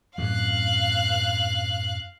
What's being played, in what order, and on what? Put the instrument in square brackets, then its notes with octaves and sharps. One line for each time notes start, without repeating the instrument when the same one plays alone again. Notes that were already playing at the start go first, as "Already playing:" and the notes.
[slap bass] F#2 A2 C3 [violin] F5 F#6